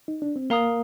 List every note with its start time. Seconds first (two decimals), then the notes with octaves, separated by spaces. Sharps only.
0.08 D#4
0.22 D4
0.36 C4
0.50 A#3 A#4 F5 A#5 D#6